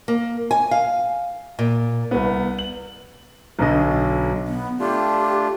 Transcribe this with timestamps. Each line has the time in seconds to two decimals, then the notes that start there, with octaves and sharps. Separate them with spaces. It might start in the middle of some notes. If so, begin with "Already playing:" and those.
0.08 A#3
0.51 G#5
0.71 F5
1.59 A#2
2.11 C2 B3
2.59 F#7
3.59 B1 B2 D3 D#5
4.46 B3
4.80 A3 D4 F4 G4